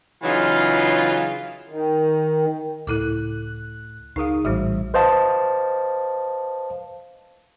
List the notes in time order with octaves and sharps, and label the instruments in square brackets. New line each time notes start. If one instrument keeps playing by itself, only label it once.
[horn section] C#3 E3 F#3 D#4 F4
[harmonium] D#3
[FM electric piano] C#2 A2 F#6 [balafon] E4 A4 D6
[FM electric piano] C#2 A#4 D#6 [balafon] D#4 G#4 F5
[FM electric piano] A#1 A2 E5 [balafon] E3 G3 F#4
[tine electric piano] B4 C5 D#5 F5 A5